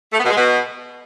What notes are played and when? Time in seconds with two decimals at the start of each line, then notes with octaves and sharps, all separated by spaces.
0.13 A3
0.18 B3
0.24 B2
0.30 G#3
0.36 B2